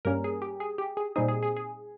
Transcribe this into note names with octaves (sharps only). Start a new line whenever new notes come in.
G2 G3 A#3 C#4 A#4
G#4
G4
G#4
G4
G#4
A#2 G3 C4 D#4 G#4
G#4
G#4
G#4